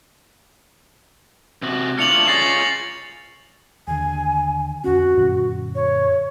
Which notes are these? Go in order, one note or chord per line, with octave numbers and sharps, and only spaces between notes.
C3 F#4
A3 D4 F4 C#7 F7 F#7
F4 G#4 C#5 A6 A#6 C7
D#2 D3 G#5
F2 C#4 F#4
F#2 A#2 D3
C#5